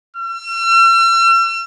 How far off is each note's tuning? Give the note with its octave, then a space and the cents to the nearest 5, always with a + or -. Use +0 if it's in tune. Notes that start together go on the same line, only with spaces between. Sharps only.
E6 +45